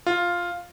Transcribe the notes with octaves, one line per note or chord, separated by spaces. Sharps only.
F4